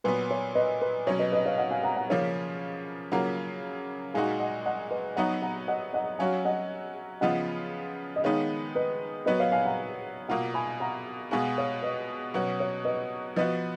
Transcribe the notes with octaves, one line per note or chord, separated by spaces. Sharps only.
A#2 F#3 B3 B4
C#5
B4 D#5
B4
B2 F#3 C#4 C#5
B4 D#5
B4 D#5
C#5 F5
D#5 F#5
F5 G#5
F#5 A#5
F#5 A#5
C#3 F3 A#3 C#4 F4 C#5
C#3 F#3 A#3 F4 F#5 A#5
A#2 G#3 D#4 F#4 F5 G#5
D#5 F#5
D#5 F#5
B4 D#5
F#3 B3 D#4 F#4 F#5 A#5
F#5 A#5
D#5 F#5
D#5 F#5
F#3 C#4 F#4 F5 G#5
D#5 F#5
C#3 F3 B3 F4 D#5 F#5
D#5
D#3 G#3 B3 D#4 C#5 F5
B4 D#5
F#3 B3 F#4 B4 D#5
C#5 F5
F5 G#5
F#5 A#5
B2 A#3 F4 F#5 A#5
G#5 B5
F#5 A#5
B2 G#3 B3 F#4 F5 G#5
C#5 F5
B4 D#5
B2 F#3 C#4 F#4 B4
C#5
B4 D#5
F3 B3 F#4 B4 D#5